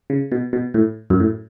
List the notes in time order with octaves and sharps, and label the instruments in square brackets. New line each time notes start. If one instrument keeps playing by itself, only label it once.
[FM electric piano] C#3
B2
B2
A2
F#2
A2